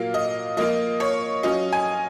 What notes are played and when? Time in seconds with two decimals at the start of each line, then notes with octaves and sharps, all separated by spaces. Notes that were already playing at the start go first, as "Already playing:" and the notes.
Already playing: A#2 F#3 A#3 F5
0.14 D#5
0.57 F3 A#3 F4 D#5
1.00 C#5
1.43 F#3 C#4 F4 D#5
1.73 G#5